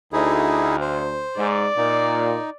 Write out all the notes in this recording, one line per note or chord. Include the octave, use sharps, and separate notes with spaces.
D2 D#4 E4 G#4
C5
G#2 D5
A#2 D#4